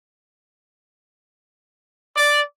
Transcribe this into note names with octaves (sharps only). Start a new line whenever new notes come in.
D5